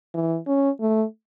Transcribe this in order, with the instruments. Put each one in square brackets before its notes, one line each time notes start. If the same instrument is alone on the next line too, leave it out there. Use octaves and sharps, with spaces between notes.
[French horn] E3
C#4
A3